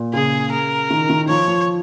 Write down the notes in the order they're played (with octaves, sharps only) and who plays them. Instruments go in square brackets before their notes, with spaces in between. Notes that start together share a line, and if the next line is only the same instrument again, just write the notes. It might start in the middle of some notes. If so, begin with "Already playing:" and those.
Already playing: [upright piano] A#2
[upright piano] C#3 [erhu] G#4
[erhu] A#4
[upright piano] D#3
D#3
[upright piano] F3 [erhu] C#5
[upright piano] F3